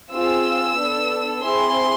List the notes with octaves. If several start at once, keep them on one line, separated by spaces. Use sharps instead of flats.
C4 F4 G#4 E6
B3 D4 A4
C4 E4 G#4 C6